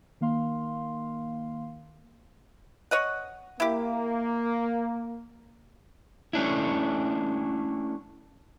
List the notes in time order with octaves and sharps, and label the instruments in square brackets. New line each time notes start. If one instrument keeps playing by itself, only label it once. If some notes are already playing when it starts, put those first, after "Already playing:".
[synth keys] D#3 A#3 F5 C6
[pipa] C#5 D#5 F#5
[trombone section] A#3 [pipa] E4 G4
[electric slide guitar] A3 C#4 D4 E4